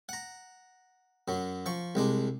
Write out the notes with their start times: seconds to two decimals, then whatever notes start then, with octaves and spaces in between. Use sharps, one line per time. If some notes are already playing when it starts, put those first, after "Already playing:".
0.09 F#5 A#5
1.28 F#2 F#3
1.66 F3 C#6
1.95 C2 G#3 D4